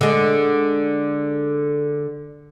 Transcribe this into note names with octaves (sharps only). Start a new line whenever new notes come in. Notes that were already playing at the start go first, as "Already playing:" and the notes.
D3 G#3